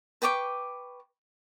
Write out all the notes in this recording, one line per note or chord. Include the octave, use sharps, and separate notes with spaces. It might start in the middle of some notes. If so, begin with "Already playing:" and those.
B4 G5 C#6 D6